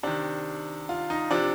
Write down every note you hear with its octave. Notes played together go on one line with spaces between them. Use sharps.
C3 D#3 D4
F4
D#4
C3 F3 D4